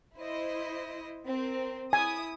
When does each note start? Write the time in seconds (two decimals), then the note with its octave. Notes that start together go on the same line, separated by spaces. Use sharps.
0.18 E4 C5 D#5
1.27 C4 A#4
1.93 E4 G#5 D#6